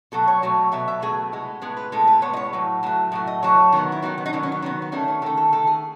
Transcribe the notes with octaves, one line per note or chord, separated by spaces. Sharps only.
B2 F#3 A3 A4
C#5
B2 F#3 A3
B2 F#3 A3 E5
E5
B2 F#3 A3 G#4
A2 G#3 B3
A2 G#3 B3 G#4
B4
A2 G#3 B3 A4
B4
A2 G#3 B3 C#5
D#5
C#5
A2 F#3
A2 F#3 A3
A2 F#3 A3
D#5
A2 F#3 A3 C#5
D#3 F#3 B3
E4
D#3 F#3 B3 D#4
B3
D#4
D#3 F#3 B3 C#4
C#4
B3
D#3 F#3 B3
B3
D#3 A3 C#4
C#4
D#3 A3 A4
A4
D#3 A3 A4
G#4